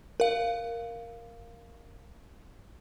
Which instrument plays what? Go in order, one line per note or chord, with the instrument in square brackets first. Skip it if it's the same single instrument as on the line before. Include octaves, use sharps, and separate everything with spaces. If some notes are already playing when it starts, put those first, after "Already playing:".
[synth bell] A#4 F5